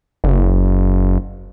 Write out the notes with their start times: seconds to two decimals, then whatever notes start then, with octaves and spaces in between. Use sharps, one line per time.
0.24 F#1